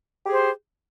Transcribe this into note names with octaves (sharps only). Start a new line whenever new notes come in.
G4 G#4 C5